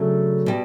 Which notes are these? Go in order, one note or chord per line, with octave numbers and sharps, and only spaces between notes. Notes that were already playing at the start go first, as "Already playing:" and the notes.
Already playing: C#3 F#3 A3 D4
B2 G3